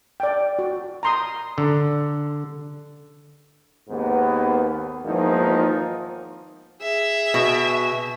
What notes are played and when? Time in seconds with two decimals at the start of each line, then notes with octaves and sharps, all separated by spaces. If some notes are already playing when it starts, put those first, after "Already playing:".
0.20 D5 G5
0.59 F#4
1.03 A#5 C6 D#6
1.58 D3
3.89 D#2 G#2 B3
5.04 G#1 E2 F3 A#3 D#4
6.82 G#4 E5
7.34 B2